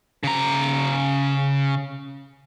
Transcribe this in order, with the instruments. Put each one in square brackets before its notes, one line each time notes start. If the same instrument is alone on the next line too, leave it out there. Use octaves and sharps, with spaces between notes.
[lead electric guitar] C#3 A#5